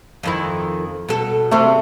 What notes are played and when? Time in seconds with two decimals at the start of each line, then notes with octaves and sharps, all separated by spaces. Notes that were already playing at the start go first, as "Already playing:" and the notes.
0.23 F2 D#3 E4
1.09 B2 A4
1.51 C3 A3 C4